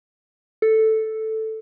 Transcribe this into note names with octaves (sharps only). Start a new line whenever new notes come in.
A4